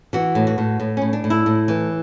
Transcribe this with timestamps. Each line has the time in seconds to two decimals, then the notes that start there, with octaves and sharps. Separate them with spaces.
0.13 E3 F#4
0.35 A2
0.47 F#4
0.58 A2
0.80 A2
0.97 A2 C#4
1.13 D4
1.24 A2
1.30 E4
1.46 A2
1.68 E3